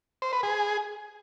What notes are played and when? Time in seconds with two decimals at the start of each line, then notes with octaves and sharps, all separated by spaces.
0.22 C5
0.33 B4
0.43 G#4